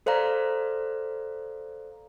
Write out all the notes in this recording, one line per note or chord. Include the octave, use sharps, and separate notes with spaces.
A4 C5 D5 F5 A#5